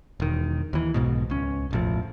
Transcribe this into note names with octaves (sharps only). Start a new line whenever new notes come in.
E1 D#3
D#2 E3
B1 G#2 B2
C#2 C#4
E1 A1 F3